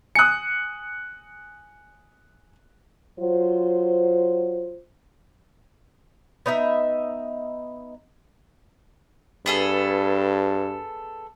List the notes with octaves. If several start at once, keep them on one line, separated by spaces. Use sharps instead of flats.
G#5 D#6 F#6 C#7
F#3 F4 C5
B3 D#4 D#5 E5
G2 B3 G#4 A4